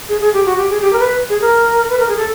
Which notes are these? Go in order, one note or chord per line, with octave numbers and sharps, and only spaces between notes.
G#4
G#4
G4
F#4
G4
G#4
G4
A#4
B4
G#4
A#4
B4
A#4
G#4
A4